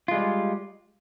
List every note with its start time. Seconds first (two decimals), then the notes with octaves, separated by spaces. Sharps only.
0.08 F4
0.11 G#3
0.14 G3